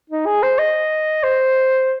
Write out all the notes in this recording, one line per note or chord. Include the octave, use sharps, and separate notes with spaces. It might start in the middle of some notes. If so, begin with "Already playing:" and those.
D#4
G#4
C5
D#5
C5